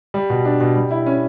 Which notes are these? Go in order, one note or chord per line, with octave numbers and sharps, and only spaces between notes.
G3
B2
D4
B2
G3
E4
C#4